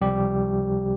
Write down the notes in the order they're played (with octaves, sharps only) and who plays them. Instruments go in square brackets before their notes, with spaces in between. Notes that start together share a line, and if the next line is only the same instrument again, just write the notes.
[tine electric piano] C#2 C3 F3 G3 G4